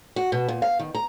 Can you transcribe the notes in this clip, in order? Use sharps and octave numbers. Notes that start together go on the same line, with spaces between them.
F#4
B2
A#2
F5
D#3
A#5